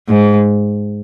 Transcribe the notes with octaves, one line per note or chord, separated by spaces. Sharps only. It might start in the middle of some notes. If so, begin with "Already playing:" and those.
G#2